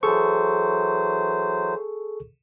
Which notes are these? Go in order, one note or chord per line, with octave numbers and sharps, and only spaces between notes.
E3 F#3 G#4 A4 C5 C#6